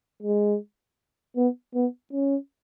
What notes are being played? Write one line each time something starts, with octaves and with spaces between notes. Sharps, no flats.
G#3
B3
B3
C#4